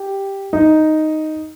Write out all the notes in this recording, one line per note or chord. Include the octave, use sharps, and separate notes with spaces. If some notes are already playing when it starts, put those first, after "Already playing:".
Already playing: G4
D#4